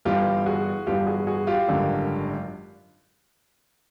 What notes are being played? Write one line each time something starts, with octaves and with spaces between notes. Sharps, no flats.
G1 G2 E3 G3 F4 G4
F#4 G#4
G1 G2 E3 G3 F4 G4
F#4 G#4
F#4 G#4
F4 G4
G#1 F#2 D3 G3